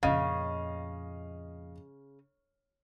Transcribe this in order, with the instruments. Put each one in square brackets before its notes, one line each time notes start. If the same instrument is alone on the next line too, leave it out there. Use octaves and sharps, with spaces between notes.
[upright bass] F2 A#2 [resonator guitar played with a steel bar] C#3 [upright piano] D#5 F5